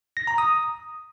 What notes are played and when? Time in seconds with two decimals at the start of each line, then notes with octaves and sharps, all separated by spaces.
0.17 A#6
0.27 A#5
0.38 D#6